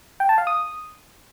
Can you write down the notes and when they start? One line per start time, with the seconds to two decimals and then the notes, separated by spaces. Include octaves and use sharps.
0.20 G5
0.29 A5
0.38 F5
0.47 D#6